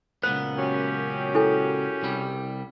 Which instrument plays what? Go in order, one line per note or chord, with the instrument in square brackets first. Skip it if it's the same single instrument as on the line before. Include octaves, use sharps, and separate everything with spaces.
[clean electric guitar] C#2 A#2 B3 [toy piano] C5
[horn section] F#2 C#4 G4
[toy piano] E4 A4 G#5
[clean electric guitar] C2 G3